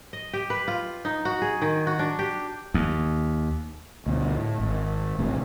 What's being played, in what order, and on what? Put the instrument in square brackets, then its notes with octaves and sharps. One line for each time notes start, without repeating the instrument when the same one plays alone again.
[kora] D#5
G4
B4
F4
D#4
F#4
G#4
D#3
F#4
D4
G4
[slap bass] D#2
[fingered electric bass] D2 B2
A2
G#1
A1 A2 C3